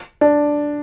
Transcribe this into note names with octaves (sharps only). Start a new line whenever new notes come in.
D4